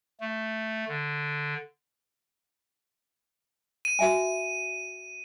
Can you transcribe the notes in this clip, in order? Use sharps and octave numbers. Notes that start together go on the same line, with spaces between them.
A3
D3
D#7
F#4 E5 G#5